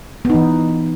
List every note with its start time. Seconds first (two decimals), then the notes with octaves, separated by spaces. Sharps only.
0.25 B3
0.30 D#4
0.34 E3